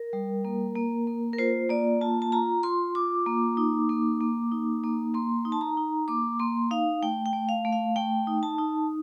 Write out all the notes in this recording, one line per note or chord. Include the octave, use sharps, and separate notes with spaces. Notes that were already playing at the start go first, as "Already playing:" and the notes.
Already playing: A#4
G3
A#3
A#3
A#3
A#4
F4 C5
A#3 D5
F4 A5
A5
F4 A#5
F4 C6
F4 D6
A#3
D#4
A#3
A#3
D#4
A#3
A#3 C6
D#4
A5
A#5
D#4
A#3 D6
A#3 C6
D#4 F5
A3 G5
G5
A3
F5
A3
F5
A3 G5
D#4
A5
D#4